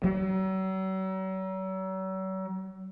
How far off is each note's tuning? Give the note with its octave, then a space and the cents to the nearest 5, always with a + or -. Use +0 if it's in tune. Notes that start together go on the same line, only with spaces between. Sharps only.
F#3 +40